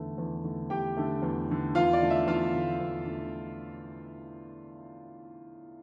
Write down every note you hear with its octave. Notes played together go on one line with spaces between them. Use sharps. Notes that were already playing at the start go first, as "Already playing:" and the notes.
Already playing: E2 D3 A3
E2
D3 A3
E2 G4 G5
D3 A3
E2
D3 A3
E2 F4 F5
D5
D3 A3
E5
E2 F4 F5
D3 A3
E2
D3 A3